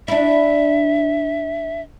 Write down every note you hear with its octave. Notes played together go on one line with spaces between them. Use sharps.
D4 E4 E5